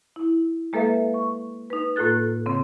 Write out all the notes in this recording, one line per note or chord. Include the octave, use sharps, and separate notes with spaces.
E4
G#3 A#3 A4 B4 E5 F5
C#6
D#4 B4
A2 A#3 F4 A4 F#6 A6
C#3 C4